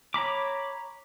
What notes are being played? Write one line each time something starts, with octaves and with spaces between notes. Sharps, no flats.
C#5 A#5 B5 D6